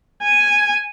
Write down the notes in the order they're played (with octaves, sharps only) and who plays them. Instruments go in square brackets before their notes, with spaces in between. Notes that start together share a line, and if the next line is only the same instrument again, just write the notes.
[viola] G#5